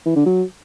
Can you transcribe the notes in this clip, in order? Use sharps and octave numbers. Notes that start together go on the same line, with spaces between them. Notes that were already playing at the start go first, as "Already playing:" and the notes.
E3
D3
F#3